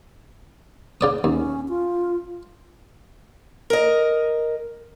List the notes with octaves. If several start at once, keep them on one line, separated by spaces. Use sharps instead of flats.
C#3 D5 D#6
D#2 C#4
F4
A#4 D#5